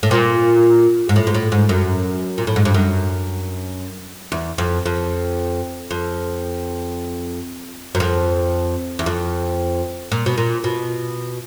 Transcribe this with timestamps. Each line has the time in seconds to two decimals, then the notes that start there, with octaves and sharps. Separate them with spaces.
0.03 A2
0.11 A#2
1.09 G#2
1.16 A2
1.27 G#2
1.34 A2
1.52 G#2
1.69 F#2
2.38 A#2
2.47 A2
2.56 G#2
2.65 G2
2.74 F#2
4.32 E2
4.58 F2
4.86 F2
5.91 F2
7.95 F#2
8.00 F2
8.99 E2
9.06 F2
10.12 A#2
10.26 B2
10.38 A#2
10.64 B2